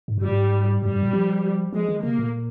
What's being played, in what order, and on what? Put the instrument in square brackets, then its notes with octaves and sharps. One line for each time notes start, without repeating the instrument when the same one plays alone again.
[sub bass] G#2
G2
[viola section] G3
[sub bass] G#2
[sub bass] G2 [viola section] G3
[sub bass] G2
A#2
F3
[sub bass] F3 [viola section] G#3
[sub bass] D#3
[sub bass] C3 [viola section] A#3
[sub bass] A#2